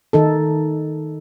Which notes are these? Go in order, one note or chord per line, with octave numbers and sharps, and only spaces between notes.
D#3 D#4 A4